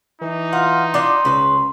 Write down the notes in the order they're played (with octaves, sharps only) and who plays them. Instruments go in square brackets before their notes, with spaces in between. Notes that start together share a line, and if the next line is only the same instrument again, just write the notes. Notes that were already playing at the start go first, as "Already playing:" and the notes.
[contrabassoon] E3 [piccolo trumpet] D#4
[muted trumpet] F4 [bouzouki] F#5
[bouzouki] D4 F4 F#5 [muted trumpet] C6
[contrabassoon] C#2 [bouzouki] C#3 B4